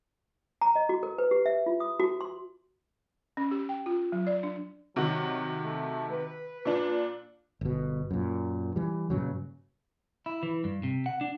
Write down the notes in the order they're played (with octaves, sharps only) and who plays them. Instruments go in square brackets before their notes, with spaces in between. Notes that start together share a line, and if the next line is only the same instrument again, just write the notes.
[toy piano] A#5
D#5
F#4
A#4
B4
G4
E5
F4
D#6
F#4
C6
[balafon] C#4
G4
G5
F4
F#3
D5
D4
[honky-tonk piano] C3 D#3 F#4 [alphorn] F#3
[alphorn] A3
B4
[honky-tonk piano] A#2 D4
[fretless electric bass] G1 B2
F#2 A#2
E3 G3
G2 A#2 C#3 F#3
[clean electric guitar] E4
E3
G2
C3
F#5
D4